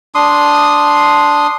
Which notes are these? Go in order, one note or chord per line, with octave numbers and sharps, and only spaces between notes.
D4 C6 D#6